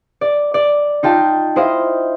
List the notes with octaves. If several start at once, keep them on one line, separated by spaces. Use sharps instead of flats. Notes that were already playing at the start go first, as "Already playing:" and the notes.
D5
D5
D#4 F4 G5 A5
E4 C5 D#5 F5